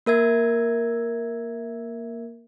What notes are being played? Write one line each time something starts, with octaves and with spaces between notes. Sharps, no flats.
A#3 A#4 E5 G#6